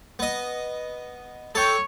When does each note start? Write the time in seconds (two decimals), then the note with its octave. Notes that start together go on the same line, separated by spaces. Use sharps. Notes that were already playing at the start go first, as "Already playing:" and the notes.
0.19 B3 D#5
1.55 A4 C#5 G5